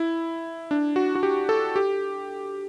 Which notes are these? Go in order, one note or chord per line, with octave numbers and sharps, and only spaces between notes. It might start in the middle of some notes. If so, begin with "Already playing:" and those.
Already playing: E4
D4
F#4
F#4
G4
A4
G4